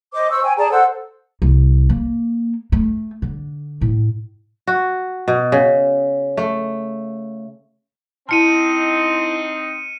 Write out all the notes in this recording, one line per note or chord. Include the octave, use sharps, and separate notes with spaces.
C5 D#5 D6
C5 C#6 E6
G5 G#5
G#4 D5 A5 A#5
A4 C5 F#5 E6
C2
A#3
A3
D3
A2
F#4
B2
C#3
A3
C4 D#4 E4 A5 F6 C#7 D#7